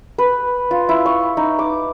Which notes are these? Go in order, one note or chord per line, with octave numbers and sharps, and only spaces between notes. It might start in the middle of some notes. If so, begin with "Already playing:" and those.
B4
F4
E4
C#6
D#4
D6